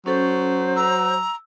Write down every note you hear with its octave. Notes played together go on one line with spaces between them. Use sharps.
F#3 C#4 A4 C5
A#5 E6